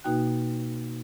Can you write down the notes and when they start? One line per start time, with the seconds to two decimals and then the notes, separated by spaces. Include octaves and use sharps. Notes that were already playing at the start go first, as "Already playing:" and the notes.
0.04 B2 A#3 D#4 F#4 G5 F#6